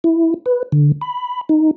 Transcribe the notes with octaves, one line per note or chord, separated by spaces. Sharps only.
E4
B4
D3
B5
D#4